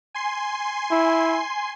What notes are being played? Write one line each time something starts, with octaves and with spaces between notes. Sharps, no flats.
G#5 C6 C7
E4